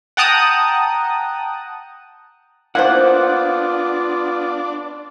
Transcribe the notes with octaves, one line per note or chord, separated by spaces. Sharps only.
F#5 G5 A5 A#5 D#6 F#6
A#3 B3 D4 E4 F4 C5 F#5